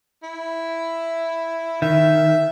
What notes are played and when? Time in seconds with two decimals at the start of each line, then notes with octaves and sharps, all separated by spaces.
0.23 E4
1.82 D#3 E5